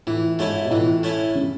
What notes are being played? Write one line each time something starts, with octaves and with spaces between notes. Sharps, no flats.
A2 E3
G#2 A3 C#4 E4
B2
A2 E3
A3 C#4 E4
C#3